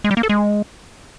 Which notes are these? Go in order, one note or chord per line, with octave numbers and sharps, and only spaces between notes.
G#3
G3
A#3
A4
G#3